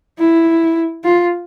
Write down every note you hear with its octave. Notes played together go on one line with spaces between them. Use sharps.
E4
F4